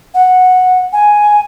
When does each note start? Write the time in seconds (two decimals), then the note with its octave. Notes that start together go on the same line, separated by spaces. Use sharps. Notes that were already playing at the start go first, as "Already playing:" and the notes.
0.14 F#5
0.93 G#5